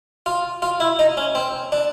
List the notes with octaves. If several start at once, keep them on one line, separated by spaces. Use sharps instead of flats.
F4
F4
E4
D#4
C#4
C4
D4